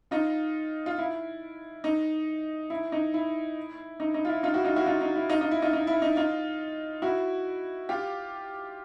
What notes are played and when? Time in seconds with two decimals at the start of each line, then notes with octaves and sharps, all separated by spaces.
0.11 D#4 F4
0.86 F4
0.98 E4
1.84 D#4
2.70 E4
2.92 D#4
3.14 E4
4.00 D#4
4.14 D#4
4.25 F4
4.29 E4
4.43 D#4 F4
4.54 E4 F#4
4.64 D#4 F4
4.76 E4 F#4
4.86 D#4 F4
5.01 D#4
5.16 E4
5.30 D#4 F4
5.41 D#4 F4
5.51 E4
5.62 D#4 F4
5.73 D#4
5.87 E4
6.02 D#4
6.16 D#4 F4
7.02 E4 F#4
7.89 F4 G4